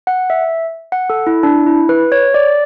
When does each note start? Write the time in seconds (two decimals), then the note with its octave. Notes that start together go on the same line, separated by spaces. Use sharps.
0.07 F#5
0.30 E5
0.92 F#5
1.10 A4
1.27 E4
1.43 D4
1.67 E4
1.89 B4
2.12 C#5
2.34 D5